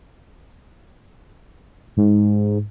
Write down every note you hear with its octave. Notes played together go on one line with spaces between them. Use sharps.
G#2